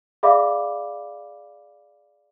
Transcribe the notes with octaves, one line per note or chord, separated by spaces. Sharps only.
G#4 D5 E5 F5 B5 D6